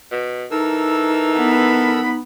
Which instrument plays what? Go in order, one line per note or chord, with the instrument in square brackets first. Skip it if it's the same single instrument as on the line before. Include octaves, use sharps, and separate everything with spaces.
[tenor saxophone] B2
[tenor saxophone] E3 [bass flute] D#4 [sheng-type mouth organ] A4 A#4 E6
[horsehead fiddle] B3 B5